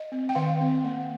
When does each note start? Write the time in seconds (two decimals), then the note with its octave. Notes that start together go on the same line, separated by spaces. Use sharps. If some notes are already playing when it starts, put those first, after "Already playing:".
Already playing: D#5
0.12 C4
0.29 G5
0.35 D#3 F5
0.61 C4
0.84 A#3